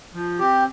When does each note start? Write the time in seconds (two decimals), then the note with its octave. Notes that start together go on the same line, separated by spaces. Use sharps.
0.14 F3
0.39 C4 G4